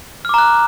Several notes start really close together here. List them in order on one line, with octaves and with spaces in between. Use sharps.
F6 D6 A#5 F#6